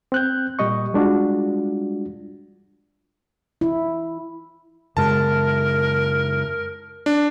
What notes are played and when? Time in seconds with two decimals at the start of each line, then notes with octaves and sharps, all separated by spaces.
0.12 C4 F#6 G6
0.59 A#2 G3 D#5 C#6
0.93 G3 G#3 D4 F4 F#4
3.61 E4
4.97 F#2 C#3 G#3 A#4 A5
7.06 D4